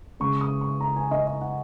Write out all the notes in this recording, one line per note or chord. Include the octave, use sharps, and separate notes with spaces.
C#3 G#3 C#4 C#6
D#6
C#6
A#5
G#5
D#5
D#5
F#5